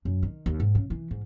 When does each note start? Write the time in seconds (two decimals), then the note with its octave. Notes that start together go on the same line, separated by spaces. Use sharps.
0.05 F#2
0.23 D#3
0.46 D#2
0.60 G#2
0.75 C#3
0.90 E3
1.11 G#2